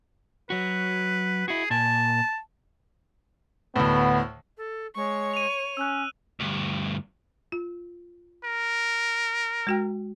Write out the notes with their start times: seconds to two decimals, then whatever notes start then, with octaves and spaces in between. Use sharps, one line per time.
0.50 F#3 F#4 B4
1.48 E4 F#4 G#4
1.71 A#2 G#5 A5
3.76 D2 A2 B3
4.57 A4
4.95 G#3 C#5 C#6
5.34 D#7 F7
5.77 C#4 E6 F#6
6.40 D2 G2
7.52 F4
8.44 A#4
9.67 G#3 F#4 G5